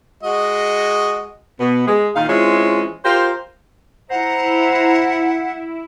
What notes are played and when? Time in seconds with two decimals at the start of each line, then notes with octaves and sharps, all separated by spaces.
0.23 G#3 F#4 D#5
1.60 B2 B3
1.87 G#3
2.16 A#2 D#3 F4 F5
2.29 E3 G#3 C4 C#4 E4 F4
3.05 F4 G4 A#4 C5
4.10 E4 C5 F#5 A#5